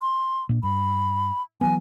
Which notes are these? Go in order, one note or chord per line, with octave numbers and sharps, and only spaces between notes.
C6
A#2 D4
G2 B5
E3 F#3 B3 G#5